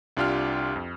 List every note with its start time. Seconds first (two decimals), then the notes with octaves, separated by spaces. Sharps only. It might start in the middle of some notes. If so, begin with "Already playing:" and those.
0.17 C2 D4 F4 G4 F6
0.76 F2